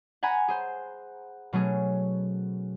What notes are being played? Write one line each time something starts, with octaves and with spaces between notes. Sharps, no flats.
F#5 G#5 A#5 B5 G#6
G#4 C5
B2 F#3 A3 C#4 G#4